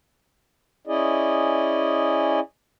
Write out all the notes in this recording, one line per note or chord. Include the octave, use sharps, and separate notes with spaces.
C#4 E4 G#4 D5 D#5